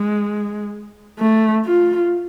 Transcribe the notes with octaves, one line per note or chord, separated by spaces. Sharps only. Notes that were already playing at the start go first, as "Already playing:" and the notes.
Already playing: G#3
A3
F4